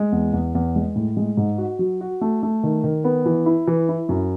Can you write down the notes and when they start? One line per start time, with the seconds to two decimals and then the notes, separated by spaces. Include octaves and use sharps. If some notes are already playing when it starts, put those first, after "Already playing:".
Already playing: G#3
0.12 E2
0.33 E2
0.55 E2
0.76 G#3
0.95 A2
1.17 G#3
1.37 G#2
1.58 F#4
1.79 F#3
2.01 F#4
2.21 A3
2.43 A3
2.63 D#3
2.84 D#3
3.04 B3
3.26 E3
3.46 E4
3.67 E3
3.89 E4
4.09 F#2